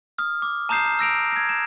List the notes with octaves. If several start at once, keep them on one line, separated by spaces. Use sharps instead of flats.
D#6 F6
D6
A5 A#5 D#6 G6 C7 E7
E6 A#6 D7 F7
G#6 A#6
E7